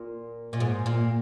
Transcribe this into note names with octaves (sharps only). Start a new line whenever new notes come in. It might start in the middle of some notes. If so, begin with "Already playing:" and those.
Already playing: A#2
A#2
G#2
A#2